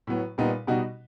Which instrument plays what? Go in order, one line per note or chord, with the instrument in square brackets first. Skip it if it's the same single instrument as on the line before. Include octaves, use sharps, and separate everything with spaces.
[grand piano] A2 F#3 B3
A#2 G3 B3 D#4
B2 G3 B3 D#4 F#4